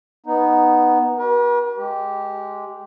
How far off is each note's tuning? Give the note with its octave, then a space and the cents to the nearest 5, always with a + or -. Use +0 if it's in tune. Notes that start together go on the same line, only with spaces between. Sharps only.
B3 +0 D#4 +0
F#4 +45 B4 -45
G#3 +5 G4 -10